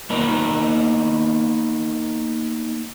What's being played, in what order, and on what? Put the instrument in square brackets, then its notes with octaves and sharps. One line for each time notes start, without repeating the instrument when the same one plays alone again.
[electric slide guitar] A#3 B3 D#4 A#4 D#5